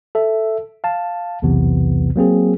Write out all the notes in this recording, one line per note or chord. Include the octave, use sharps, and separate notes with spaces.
A4 E5
F5 A5
B1 E2 C3 E3 B3
F#3 A#3 C4 G#4